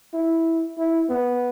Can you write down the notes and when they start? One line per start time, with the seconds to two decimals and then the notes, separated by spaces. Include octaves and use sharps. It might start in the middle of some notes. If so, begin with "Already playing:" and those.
0.14 E4
0.78 E4
1.09 B3